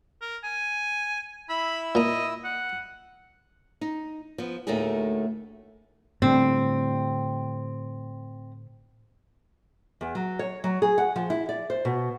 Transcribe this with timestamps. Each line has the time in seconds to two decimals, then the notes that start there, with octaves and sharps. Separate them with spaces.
0.21 A#4
0.44 G#5
1.49 E4 B5 E6
1.95 A#2 D#5 A#5
2.44 F#5
3.81 D#4
4.38 F3 B3
4.67 D2 A2 A3 A#3 D#4 G#4
6.22 A2 D3 G3 C4
10.01 E2
10.15 F#3
10.39 C#5
10.64 F#3
10.82 G#4
10.98 F#5
11.16 F3
11.30 E4
11.49 D5
11.70 C5
11.85 B2